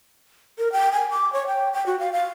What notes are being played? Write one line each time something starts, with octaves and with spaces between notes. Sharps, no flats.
A#4
G5
G#5
D6
C#5
G5
G5
F#4
F5
F5